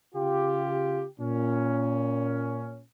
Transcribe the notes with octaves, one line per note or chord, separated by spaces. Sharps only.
C#3 F4 G4
A#2 C#4